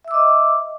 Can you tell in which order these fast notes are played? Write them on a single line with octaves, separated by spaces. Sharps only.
E5 E6 D6 D#5